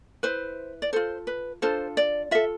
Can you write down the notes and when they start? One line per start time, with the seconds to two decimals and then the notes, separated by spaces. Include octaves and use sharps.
0.23 E4 B4 C5
0.82 D5
0.93 F4 A4 C5
1.27 B4
1.62 D4 F4 A4 C5
1.97 D5
2.31 F4 A4 E5